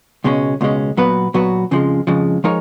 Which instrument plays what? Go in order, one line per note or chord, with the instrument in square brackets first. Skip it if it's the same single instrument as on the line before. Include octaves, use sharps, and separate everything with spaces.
[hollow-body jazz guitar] C#2 B2 G#3 C#4
C#2 B2 G#3 C#4
A#2 F#3 B3 F#4 B4
A#2 F#3 B3 F#4 B4
F2 C#3 F3 G#3
F2 C#3 F3 G#3
F3 G#3 D#4 A#4 C#5